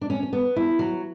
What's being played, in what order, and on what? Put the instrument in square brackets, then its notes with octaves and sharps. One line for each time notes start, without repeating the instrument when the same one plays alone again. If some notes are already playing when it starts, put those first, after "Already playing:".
[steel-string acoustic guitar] D4
C#4
C#4
B3
E4
F#3